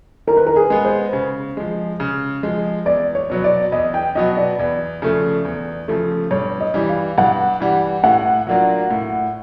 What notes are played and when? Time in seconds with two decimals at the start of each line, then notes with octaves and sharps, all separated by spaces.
0.27 D#3 A#4
0.37 B4
0.47 A#4
0.56 G#4
0.70 G#3 B3
0.85 C5
1.13 C#3
1.57 F3 G#3
2.00 C#3
2.43 F3 G#3
2.86 E2 D5
3.15 C#5
3.30 B2 F#3 B3
3.44 D5
3.72 E2 D#5
3.94 G5
4.15 B2 F#3 B3 D#5
4.37 D5
4.58 E2 D5
5.02 C#3 F3 A3
5.45 E2
5.88 C#3 F3 A3
6.31 G2 C#5
6.60 D#5
6.74 E3 G3
6.89 F5
7.18 G2 F#5
7.60 E3 G3
8.04 A2 F#5
8.47 F#3 A#3 D4 F4
8.91 A2